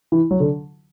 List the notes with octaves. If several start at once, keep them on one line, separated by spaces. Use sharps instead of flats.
E3
F#3
D3